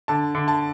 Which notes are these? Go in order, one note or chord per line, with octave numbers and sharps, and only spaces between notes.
D3 A5
D3
A5